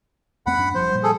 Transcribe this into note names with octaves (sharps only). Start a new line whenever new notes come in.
E2 A3 C4 F#5 B5
F#2 D4
F1 G2 F3 C5
A#2 F3 G3
G#4 A4